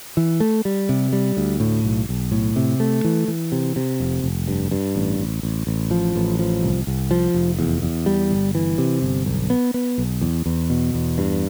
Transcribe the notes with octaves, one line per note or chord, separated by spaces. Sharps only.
E3
A3
G3
C3
G3
D2
A2
B1
B1
A2
C3
A3
E3
E3
C3
C3
F1
F1
G2
G2
A1
A1
A1
A1
F3
A1
F3
C2
C2
F3
F1
E2
E2
G3
G1
E3
C3
G1
B1
B3
B3
B1
E2
E2
B2
E2
G2